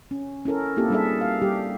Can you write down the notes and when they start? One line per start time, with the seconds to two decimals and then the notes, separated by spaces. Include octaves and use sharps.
0.11 C#4
0.45 C#4 E4 A4 A#4
0.77 A#3 C4 E4 F4 G4 A4
0.90 G3 D4 G#4 A4 E5
1.21 F5
1.42 G3 G4